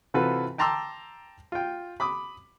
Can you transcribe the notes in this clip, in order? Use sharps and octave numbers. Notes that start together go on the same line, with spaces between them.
C3 E3 F4 F#4 A4 B4
G5 A5 A#5 C6 D6 E6
F4 G5
B5 D6 D#6